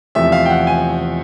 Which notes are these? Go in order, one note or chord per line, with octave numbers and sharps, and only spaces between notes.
E2 C3 F3 A3 E5
F5
G5
F#5
G#5